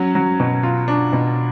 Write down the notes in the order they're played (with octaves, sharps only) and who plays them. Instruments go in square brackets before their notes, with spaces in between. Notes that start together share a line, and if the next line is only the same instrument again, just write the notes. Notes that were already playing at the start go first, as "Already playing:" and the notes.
Already playing: [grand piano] F#3 C#4
F#3
B2
F4
D4
B2